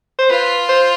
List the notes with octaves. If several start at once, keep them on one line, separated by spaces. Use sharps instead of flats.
C5
F4 B4
C5